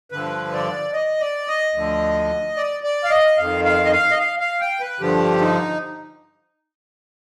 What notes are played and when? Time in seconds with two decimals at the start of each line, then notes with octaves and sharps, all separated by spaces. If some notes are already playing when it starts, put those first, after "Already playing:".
0.12 G2 D3 F3 B4
0.53 D5
0.93 D#5
1.21 D5
1.48 D#5
1.74 D2 D3 F3
2.57 D5
2.84 D5
3.04 F5
3.10 D#5
3.38 F2 D#3 F5
3.65 F5
3.85 D#5
3.92 F5
4.11 D#5
4.19 F5
4.39 F5
4.61 G5
4.80 B4
5.00 G2 D3 F3 G4
5.41 D#4